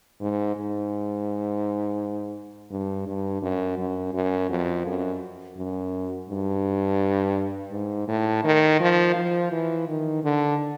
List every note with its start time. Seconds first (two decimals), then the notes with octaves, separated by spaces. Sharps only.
0.21 G#2
0.56 G#2
2.71 G2
3.07 G2
3.42 F#2
3.78 F#2
4.14 F#2
4.50 F2
4.86 F#2
5.58 F#2
6.29 G2
7.72 G#2
8.08 A2
8.44 D#3
8.80 F3
9.16 F3
9.52 E3
9.88 D#3
10.24 D3